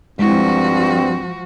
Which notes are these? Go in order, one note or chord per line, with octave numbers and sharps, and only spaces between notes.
G2 F3 G#3 C4 E4 F#4